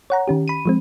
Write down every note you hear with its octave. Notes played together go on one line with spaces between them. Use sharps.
C#5 F#5 A#5
D#3 C#4 G4
B5 D#7
F3 G#3 C4